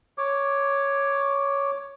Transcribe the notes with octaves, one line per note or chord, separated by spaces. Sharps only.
C#5 D6